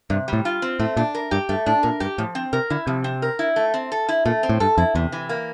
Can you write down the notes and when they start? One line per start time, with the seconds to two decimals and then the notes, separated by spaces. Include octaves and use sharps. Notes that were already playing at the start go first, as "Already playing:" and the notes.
0.10 G2 C3
0.28 G3
0.33 A2
0.45 F4
0.62 C4
0.79 A2 A3
0.97 A#2 D4
1.15 A#4
1.31 G2 G4
1.49 G2 A3
1.66 A2 D4
1.83 A#2 A#4
2.00 G2 G4
2.18 A2 F3
2.35 C4
2.53 C3 A#4
2.70 D3 E4
2.87 C3 F3
3.04 C4
3.22 A#4
3.39 E4
3.56 A3
3.74 C4
3.92 A4
4.09 E4
4.25 A#2 A3
4.43 C4
4.49 A2
4.60 G2 A4
4.78 F2 E4
4.95 E2 C3
5.12 E3
5.29 A#3